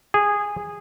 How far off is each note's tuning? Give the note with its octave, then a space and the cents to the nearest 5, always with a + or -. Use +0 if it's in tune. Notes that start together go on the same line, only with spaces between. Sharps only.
G#4 -15